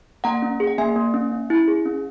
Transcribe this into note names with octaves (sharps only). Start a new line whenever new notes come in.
A#3 F#5 A#5
C#4
G#4
F#5
A#3 E5 G#5
A#3
C#4
C#4
E4
G#4
C#4